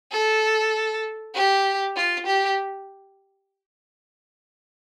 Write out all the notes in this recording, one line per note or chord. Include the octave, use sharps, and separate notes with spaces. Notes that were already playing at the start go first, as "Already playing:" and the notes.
A4
G4
F4
G4